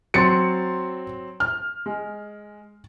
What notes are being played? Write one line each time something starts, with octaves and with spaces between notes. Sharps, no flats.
F#3 C4 C6 A6 C#7
F6
G#3